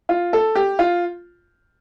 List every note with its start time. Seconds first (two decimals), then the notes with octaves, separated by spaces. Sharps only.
0.09 F4
0.33 A4
0.55 G4
0.79 F4